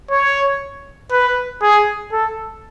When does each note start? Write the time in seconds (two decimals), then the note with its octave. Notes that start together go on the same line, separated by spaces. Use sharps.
0.11 C#5
1.12 B4
1.62 G#4
2.12 A4